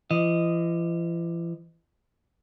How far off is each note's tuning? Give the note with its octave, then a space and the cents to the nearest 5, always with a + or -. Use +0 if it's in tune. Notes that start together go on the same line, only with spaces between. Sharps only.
E3 +45 D#5 +0